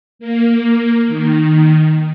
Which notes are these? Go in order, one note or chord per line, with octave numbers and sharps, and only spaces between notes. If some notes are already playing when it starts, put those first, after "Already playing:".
A#3
D#3